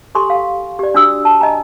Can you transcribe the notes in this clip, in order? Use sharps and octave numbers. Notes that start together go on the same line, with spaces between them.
G4 A4 G#5 C6 C#6
F5
G4 D5
D4 F#4 D#6 E6
A5
D#5 G#5 A#5